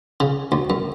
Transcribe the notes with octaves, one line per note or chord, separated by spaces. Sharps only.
C#3
D2
F#2